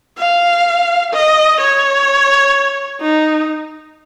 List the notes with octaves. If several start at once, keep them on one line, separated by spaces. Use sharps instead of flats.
F5
D#5
C#5
D#4